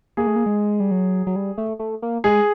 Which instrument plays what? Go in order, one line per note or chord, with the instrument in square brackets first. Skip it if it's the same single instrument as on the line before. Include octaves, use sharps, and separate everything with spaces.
[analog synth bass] A#3 [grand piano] G#4
[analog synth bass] A3
A#3
G#3
G3
F#3
F#3
G3
A3
A3
A#3
[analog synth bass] G#3 [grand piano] G#4